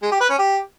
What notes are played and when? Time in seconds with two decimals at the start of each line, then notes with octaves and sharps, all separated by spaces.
0.03 G#3
0.12 G4
0.21 B4
0.30 C#4
0.39 G4